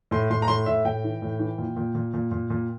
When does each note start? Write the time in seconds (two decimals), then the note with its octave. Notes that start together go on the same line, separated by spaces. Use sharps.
0.11 A2 C6
0.30 A2 C6
0.42 A#5
0.48 A2 C6
0.66 A2 E5
0.85 A2 G5
1.04 E3
1.22 A2
1.39 E3
1.58 A#2
1.77 A#2
1.95 A#2
2.14 A#2
2.32 A#2
2.50 A#2